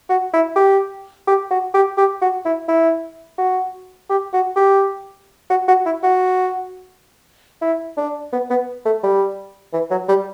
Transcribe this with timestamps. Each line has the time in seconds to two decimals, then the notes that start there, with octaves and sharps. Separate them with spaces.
0.09 F#4
0.33 E4
0.56 G4
1.27 G4
1.51 F#4
1.74 G4
1.98 G4
2.21 F#4
2.45 E4
2.68 E4
3.38 F#4
4.09 G4
4.33 F#4
4.56 G4
5.50 F#4
5.68 F#4
5.85 E4
6.03 F#4
7.62 E4
7.97 D4
8.32 B3
8.50 B3
8.85 A3
9.03 G3
9.73 E3
9.91 F#3
10.08 G3